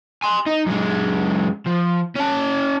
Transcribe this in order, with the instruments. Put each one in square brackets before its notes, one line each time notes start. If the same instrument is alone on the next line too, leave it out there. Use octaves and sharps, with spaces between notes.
[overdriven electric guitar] G#5 C6
D#4
F#2 G#3
F3
C#4 A5